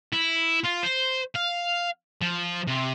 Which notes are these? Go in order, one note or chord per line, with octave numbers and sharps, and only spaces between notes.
E4
F4
C5
F5
F3
C3